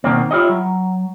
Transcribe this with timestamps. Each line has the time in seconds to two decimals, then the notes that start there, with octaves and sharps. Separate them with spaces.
0.04 B2 D#3 A#3 C4
0.31 E4 F4 G4 C#5 D#5
0.49 F#3